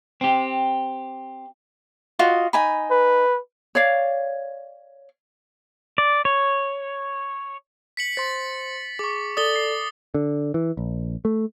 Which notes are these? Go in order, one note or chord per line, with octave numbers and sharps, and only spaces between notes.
C4 G4
F4 F#4 D#5
D#4 G#5 B5
B4
C#5 D5 F5
D5
C#5
B6 C#7 F#7
C5 C6 A6
G#4 C#6 D6
A4 D5 D#6 A6 G7
C7
D3
E3
A#1
A3